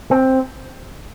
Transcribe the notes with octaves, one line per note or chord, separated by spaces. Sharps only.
C4